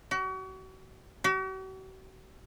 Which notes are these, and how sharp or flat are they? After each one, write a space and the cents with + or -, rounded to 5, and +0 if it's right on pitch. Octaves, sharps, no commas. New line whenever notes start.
F#4 +35
F#4 +45